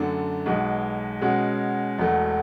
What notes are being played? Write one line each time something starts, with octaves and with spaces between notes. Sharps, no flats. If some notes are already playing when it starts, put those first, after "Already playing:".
Already playing: F#2 D3 A3 D4
B1 B2 G#3
B2 G#3 C#4 F#4
E1 E2 B2 A3